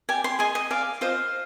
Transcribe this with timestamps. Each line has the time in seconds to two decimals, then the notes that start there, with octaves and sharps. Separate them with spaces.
0.09 G4 D5 G#5
0.24 C6
0.39 G#4 D#5 G#5
0.55 D#5
0.70 G#4 D5 F5
1.01 F4 C5 D#5 F5